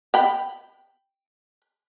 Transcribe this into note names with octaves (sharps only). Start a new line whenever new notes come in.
G5 B5